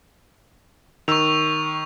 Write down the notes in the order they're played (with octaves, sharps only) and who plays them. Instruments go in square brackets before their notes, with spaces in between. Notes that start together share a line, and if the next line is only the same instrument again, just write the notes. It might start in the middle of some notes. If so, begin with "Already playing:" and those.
[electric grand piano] D#3 E6 [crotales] C#6 F7